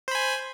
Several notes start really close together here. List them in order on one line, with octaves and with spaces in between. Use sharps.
C5 B5 G#5